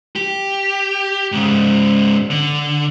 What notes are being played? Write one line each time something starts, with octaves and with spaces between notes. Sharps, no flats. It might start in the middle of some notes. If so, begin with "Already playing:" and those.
G4
G#2 C#3
D3